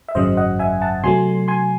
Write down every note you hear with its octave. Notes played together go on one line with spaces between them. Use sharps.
E5
G#1 F#2 C#3 F#3 C5 D#5
D#5 F#5
E5 G#5
F#5 A5
C3 F#3 A3 G#5 C6
G#5 C6